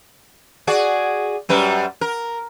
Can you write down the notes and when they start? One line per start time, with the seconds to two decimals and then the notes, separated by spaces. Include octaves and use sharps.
0.67 F#4 G#4 D5
1.49 F#2 G3 B4
2.01 A#4